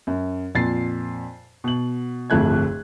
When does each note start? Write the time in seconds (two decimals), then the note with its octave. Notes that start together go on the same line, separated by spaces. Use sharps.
0.07 F#2
0.55 F2 A#2 A6 C7
1.64 B2 F#7
2.30 D1 G1 F2 A3 F#6 G#6